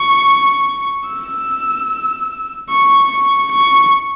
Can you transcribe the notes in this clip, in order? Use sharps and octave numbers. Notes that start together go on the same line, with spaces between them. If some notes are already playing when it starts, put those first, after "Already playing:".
Already playing: C#6
E6
C#6
C#6
C#6